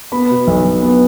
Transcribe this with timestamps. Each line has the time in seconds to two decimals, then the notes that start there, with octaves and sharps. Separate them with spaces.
0.12 B3 B5
0.30 B2
0.47 B1
0.65 B1
0.82 B3